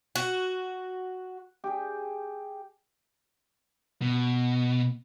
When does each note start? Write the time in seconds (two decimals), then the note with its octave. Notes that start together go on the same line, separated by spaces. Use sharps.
0.16 F#4
1.64 G4 G#4
4.02 B2